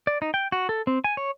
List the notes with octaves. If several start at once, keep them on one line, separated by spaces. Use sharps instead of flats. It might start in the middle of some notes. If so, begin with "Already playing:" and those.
D5
D#4
G5
F#4
A4
C4
G#5
C#5